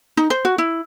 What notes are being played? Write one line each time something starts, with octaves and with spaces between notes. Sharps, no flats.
D#4
C5
F#4
E4